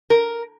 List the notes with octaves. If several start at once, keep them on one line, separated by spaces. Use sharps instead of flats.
A#4